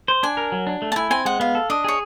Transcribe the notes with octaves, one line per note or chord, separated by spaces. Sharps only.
C5
D4 G#5
A#4
F#3
D4
A3
A5
E4 G#5
C4 G#5
G#3 F#5
B3 F5
A4
D4 D#5
G#4 C#5